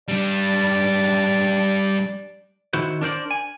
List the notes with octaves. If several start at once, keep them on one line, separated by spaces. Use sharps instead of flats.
G3 D4 D5
D#3 E4 F#4 C5
D4 A#4 C5 D5
G#5